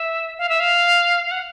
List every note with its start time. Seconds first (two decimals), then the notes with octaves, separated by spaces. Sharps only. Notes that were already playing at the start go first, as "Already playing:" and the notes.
Already playing: E5
0.38 F5
0.49 E5
0.60 F5
1.26 F5
1.31 F#5